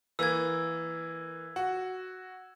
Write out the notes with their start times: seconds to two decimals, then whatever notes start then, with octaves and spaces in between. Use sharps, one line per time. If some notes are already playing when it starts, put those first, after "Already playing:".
0.19 E3 A#3 E6 G#6
1.56 F#4